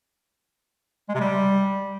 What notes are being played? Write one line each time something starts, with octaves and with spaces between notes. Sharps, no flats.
G#3
C3
G3